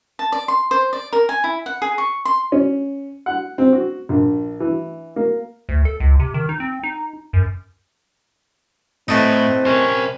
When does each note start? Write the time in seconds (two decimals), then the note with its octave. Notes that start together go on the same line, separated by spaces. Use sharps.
0.19 A5
0.32 D5
0.48 C6
0.71 C5
0.93 D5
1.13 A#4
1.29 G#5
1.44 E4
1.66 F#5
1.82 G#4
1.98 C#6
2.25 C6
2.52 C#4
3.26 F#5
3.58 C4
3.73 F#4
4.09 A#1
4.60 E3
5.16 A#3
5.69 D2
5.85 A4
6.00 C#2
6.20 C3
6.34 D#3
6.49 D#4
6.60 C4
6.83 D#4
7.33 F#2
9.08 A2 E3 A3 C4 D#4
9.65 C3 C#4 A#4 C5